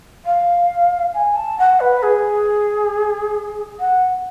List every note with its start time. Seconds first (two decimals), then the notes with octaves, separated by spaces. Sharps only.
0.25 F5
1.14 G#5
1.36 A5
1.58 F#5
1.80 B4
2.02 G#4
3.79 F#5